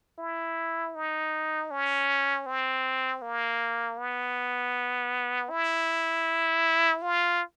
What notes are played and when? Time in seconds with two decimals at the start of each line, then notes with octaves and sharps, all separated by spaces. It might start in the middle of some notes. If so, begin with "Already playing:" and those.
0.18 E4
0.95 D#4
1.71 C#4
2.46 C4
3.22 A#3
3.98 B3
5.50 E4
7.02 F4